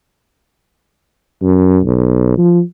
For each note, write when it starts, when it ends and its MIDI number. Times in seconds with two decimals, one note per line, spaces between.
1.42 1.79 42
1.84 2.37 35
2.38 2.62 53